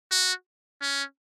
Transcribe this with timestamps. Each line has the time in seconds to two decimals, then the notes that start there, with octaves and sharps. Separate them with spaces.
0.11 F#4
0.82 C#4